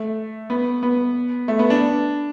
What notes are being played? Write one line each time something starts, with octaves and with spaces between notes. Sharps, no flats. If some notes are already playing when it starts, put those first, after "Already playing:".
Already playing: A3
B3
B3
A3
B3
D4